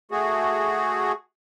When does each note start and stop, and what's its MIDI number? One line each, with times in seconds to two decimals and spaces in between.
0.11 1.12 57
0.11 1.12 66
0.11 1.12 68